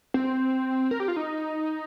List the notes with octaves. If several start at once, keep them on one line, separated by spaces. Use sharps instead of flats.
C4
A#4
G4
F4
D#4